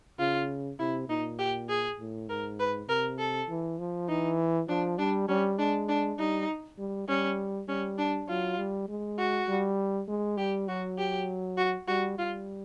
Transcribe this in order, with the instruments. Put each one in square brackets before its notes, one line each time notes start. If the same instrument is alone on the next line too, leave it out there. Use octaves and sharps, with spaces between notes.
[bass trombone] C#3 [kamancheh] F4
[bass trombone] C3 [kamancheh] E4
[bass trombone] A#2 [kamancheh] D#4
[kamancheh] G4
G#4
[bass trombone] A2
[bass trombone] G#2 [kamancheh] A#4
[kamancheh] B4
[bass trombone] C3 [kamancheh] A#4
[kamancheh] A4
[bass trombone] E3
F3
[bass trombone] E3 [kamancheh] D#4
[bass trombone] F3 [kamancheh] D4
[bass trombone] G3 [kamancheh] D4
[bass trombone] G3 [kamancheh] C#4
[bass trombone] G#3 [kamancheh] D4
[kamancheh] D4
[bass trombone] G3 [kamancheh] D#4
[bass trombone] G3
[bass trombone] G3 [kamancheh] C#4
[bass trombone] G3 [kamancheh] C#4
[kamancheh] D4
[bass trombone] F#3 [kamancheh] F4
[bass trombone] G3
G#3
[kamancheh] F#4
[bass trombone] G3
G#3
[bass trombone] G3 [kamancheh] G4
[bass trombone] F#3 [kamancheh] F#4
[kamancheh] G4
F#4
[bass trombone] G3 [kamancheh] F#4
[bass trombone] G3 [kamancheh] F4